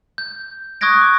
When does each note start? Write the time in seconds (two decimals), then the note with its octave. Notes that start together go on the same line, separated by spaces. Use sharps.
0.18 G6
0.81 C#6 D#6 F#6 G#6 A#6 D7
1.02 D6